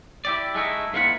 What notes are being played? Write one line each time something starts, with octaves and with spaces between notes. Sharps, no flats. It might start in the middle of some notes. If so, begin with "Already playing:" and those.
E4 G4 D5
G#3 A3 D#4 E4
G#2 A#3 E4 F4 F#5 B5